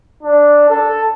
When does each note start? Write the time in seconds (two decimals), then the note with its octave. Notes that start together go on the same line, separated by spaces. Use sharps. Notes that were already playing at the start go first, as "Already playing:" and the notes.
0.23 D4
0.70 A4